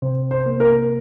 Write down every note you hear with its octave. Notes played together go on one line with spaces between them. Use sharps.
C3 C5
C5
A#3
A#4